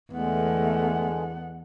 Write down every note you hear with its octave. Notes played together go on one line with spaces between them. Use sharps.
E2 D3 G#3 A3 B3 F#5